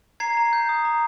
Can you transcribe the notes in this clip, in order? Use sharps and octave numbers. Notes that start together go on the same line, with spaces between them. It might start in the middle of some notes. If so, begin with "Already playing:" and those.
A#5 G#6 C7
A#5
G6
D#6
A#5